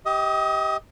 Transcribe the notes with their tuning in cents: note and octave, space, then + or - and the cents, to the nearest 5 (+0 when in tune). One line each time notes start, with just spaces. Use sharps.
G4 -5 D#5 +35 D#6 +0